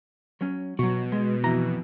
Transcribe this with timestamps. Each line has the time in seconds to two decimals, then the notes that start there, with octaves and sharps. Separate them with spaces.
0.41 F#3 C#4
0.79 B2 F#3 F#4
1.12 G#3
1.43 F2 E3 A#5